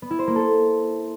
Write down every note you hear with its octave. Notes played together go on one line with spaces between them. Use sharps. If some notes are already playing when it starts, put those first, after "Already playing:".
B3
E4
C5
A#3
A4